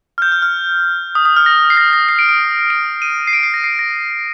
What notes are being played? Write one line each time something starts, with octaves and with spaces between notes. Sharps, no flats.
F6
G6
F6
F6
D#6
D#6
F6
A#6
C7
A#6
A#6
C7
D7
D7
D7
D#7
C7
D7
C7
A#6
C7
A#6